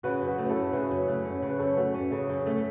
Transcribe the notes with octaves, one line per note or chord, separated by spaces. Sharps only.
C#3 F#4 B4
F#2
F#4 B4
A3
B4
E4 A4
C#4
C#3 F#4 B4
F#2
A3
C#4
C#3 C#5
B4
F#2 A4 C#5
A3 F#4 B4
C#4
C#3 A4 C#5
F#2
A3